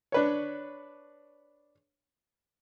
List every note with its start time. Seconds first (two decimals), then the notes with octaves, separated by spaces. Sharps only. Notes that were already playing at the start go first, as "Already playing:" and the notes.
0.12 D4 B4 C#5